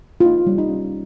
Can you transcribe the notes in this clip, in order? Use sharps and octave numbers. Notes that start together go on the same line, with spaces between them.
F4
A#3 D#4
G3
D#4
C#4